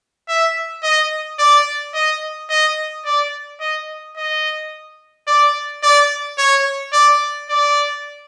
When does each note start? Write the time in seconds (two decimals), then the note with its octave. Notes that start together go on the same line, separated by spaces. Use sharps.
0.28 E5
0.83 D#5
1.39 D5
1.94 D#5
2.50 D#5
3.05 D5
3.60 D#5
4.16 D#5
5.27 D5
5.83 D5
6.38 C#5
6.93 D5
7.49 D5